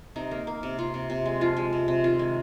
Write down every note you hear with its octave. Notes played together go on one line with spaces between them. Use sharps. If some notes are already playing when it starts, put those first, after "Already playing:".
C3 D#4
A#3
A#3
C3
C3 F4
C3
C3
G#3
F3 F4
G#3
C3
C3
D#3 F4
G#3